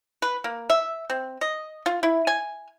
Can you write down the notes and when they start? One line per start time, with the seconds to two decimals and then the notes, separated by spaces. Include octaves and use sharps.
0.22 B4
0.44 A#3
0.70 E5
1.10 C4
1.41 D#5
1.86 F4
2.03 E4
2.27 G#5